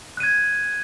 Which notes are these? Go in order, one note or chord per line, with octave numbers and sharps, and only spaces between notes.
F#6 G#6 D#7